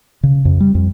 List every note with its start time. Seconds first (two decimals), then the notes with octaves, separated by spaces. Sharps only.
0.23 C#3
0.45 F2
0.60 G3
0.75 F2